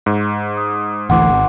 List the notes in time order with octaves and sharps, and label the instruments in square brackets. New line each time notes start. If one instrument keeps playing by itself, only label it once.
[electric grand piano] G#2
[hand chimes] D#6
[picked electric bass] A1 D2 E3 [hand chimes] F#5 C6 D6
[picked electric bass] G#1